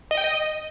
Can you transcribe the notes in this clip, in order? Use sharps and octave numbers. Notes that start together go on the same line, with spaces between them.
D#5
G5
D#5